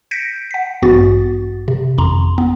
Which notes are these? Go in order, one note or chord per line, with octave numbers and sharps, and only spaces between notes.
G6 A#6 B6 C#7 D7
F#5 B6
A1 G2 B3 F#4 A6
C3
G#1 F2 A#5 C6
B3